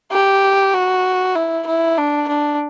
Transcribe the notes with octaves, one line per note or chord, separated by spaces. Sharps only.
G4
F#4
E4
E4
D4
D4